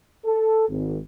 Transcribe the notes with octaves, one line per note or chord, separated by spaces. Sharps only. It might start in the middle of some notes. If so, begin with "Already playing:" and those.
A4
G#1